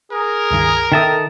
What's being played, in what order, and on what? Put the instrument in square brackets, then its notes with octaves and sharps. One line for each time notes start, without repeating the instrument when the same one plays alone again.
[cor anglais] G#4 [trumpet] A#4
[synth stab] C#2 G2 D#3
[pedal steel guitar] D#3 A5 D#6 [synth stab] A4 E5 G5